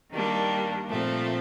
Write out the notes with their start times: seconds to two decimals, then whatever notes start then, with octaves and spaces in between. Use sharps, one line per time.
0.12 D#3 G3 A#3 D4
0.89 A#2 F3 A3 C4